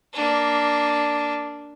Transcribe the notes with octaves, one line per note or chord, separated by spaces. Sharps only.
A#3 D4